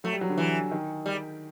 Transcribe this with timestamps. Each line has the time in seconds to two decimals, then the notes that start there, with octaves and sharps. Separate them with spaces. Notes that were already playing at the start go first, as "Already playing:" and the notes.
0.04 F#3 A3
0.13 G3
0.21 F#3
0.29 D3
0.38 E3
0.71 D#3
1.06 G3